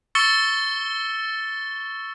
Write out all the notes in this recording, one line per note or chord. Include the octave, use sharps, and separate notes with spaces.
C#6 E6 A6 C#7 G7